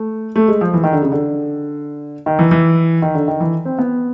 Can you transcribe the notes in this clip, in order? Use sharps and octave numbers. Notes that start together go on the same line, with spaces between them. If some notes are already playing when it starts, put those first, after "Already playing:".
Already playing: A3
A3
G#3
F3
E3
D#3
D3
C#3
D3
D#3
E3
E3
D#3
D3
D#3
E3
C4
B3